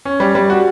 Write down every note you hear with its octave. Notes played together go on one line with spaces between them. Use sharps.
C#4
G3
G3
F#4